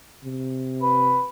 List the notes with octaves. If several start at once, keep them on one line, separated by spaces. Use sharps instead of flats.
C3
B4